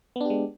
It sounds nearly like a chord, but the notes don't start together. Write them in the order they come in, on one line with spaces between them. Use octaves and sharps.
B3 D4 G4 G#3